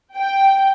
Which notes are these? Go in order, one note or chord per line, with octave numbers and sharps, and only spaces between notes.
G5